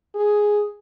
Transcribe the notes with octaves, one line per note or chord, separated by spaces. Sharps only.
G#4